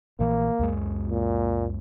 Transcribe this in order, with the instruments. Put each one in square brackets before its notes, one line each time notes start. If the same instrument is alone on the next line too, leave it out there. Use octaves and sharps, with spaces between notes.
[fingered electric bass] A#1 A#2 E3 [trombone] A#3
[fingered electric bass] C#2 F#2 G#3
[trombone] A#2